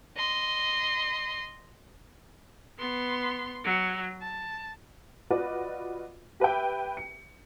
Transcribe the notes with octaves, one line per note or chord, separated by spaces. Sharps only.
D#5 C6
B3 C6
F#3
A5
F4 F#4 B4 D5 D#5
G4 B4 E5 G5
C#7